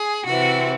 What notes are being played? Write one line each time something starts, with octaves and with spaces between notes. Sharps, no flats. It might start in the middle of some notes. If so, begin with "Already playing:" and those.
Already playing: G#4
C3 E3 C4 F#4